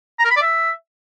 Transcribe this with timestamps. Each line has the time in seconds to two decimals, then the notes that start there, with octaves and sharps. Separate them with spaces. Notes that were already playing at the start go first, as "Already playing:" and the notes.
0.19 A#5
0.25 A#4
0.31 B5
0.36 D5
0.42 E5